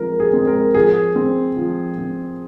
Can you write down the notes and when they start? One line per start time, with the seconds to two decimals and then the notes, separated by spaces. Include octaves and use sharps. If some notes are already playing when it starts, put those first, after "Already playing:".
Already playing: F3 G#3 C4 A#4
0.20 G#4
0.33 G#3 C4
0.47 A#4
0.74 F3 G#4
1.16 C4
1.57 F3
1.98 C4